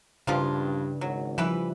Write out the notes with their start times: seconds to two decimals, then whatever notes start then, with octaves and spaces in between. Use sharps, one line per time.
0.27 G2 C#3 F3 A#3 D4 E4 F4
1.01 G#1 F#3
1.38 E3 F3 G3 E4 B4